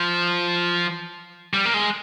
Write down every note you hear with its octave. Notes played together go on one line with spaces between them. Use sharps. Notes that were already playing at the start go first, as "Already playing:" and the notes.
Already playing: F3
G3
A#3
G#3